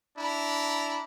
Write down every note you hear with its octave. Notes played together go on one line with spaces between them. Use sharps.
D4 E4 A#5